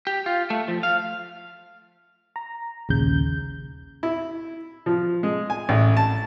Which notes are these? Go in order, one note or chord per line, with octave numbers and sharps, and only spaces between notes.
G4
F4
A3
F3
F5
A#5
A#1 D#2 C#3 G6
E4
F3
G#3
G#5
A1
A5